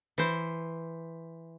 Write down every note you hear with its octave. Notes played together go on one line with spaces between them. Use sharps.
E3 C5